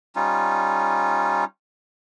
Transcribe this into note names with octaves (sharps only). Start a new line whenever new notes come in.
G3 C#4 D#4 F4